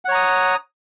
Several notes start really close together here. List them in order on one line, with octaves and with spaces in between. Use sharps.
F#5 C#5 A#5 D#6